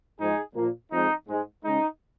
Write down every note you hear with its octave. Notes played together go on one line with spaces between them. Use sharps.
G#2 F3 G#3 D#4 G#4
A#2 F3 A#3
F2 F3 G#3 D#4
G#2 G#3
C#3 G#3 D#4